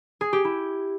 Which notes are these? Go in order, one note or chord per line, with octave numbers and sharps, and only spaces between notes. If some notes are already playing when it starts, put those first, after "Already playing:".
G#4
G4
E4